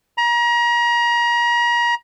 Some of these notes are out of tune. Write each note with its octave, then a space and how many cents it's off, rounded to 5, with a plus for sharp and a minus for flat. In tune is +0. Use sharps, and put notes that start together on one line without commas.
A#5 +35